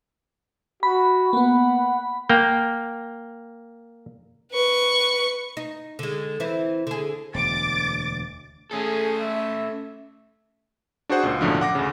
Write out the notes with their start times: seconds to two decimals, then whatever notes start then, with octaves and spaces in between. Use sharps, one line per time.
0.83 F#4 B5
1.33 A#3 B3 F#5
2.29 A#3 G5
4.52 B4 C#6
5.57 D#4
5.99 D3 G#3
6.40 E3 C4 E4
6.87 D3 G#4
7.35 E1 D2 D6 A6
8.71 A3 C#4 G#4 A4
9.20 E5
11.09 D4 F#4 G#4 C5 F#5
11.23 C#2 A#2
11.41 B1 F#2 A2 D3 F3
11.61 F#5 D6 A#6
11.75 D2 C#3